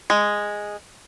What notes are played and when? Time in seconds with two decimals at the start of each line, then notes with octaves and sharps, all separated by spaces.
0.10 G#3